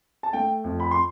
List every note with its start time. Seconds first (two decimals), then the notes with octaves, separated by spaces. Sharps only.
0.23 A5
0.33 A3 G5
0.64 F2
0.80 B5
0.91 C6